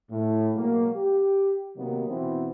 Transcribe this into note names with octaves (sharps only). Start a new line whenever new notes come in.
A2
B2 F#3 G#3 A#3
G4
C3 D#3 F#3 A#3 B3
B2 E3 B3 C4